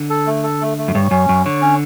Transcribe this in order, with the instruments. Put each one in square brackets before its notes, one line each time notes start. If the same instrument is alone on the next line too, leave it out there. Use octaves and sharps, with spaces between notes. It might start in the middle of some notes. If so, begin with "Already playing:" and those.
Already playing: [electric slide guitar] D3
[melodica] A4
A3
A4
A3
A3
[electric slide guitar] F#2
[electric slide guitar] G2 [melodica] C#5
[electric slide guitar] F#2 [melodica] C#4
[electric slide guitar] F#2 [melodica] C#5
[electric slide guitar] D3 [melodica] C#5
[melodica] C#4